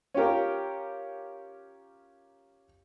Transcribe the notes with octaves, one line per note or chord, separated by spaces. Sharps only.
C#4 F4 G4 A#4